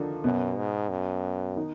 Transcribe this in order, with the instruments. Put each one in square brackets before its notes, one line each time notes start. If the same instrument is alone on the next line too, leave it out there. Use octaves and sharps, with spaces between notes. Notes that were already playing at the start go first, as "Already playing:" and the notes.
Already playing: [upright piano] D3 D#3 F3 D4 D#4 F4
[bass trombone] F#2 [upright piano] B2 B3
[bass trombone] G#2
F#2
[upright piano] D#3 D#4